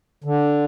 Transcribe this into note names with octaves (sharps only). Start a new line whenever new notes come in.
D3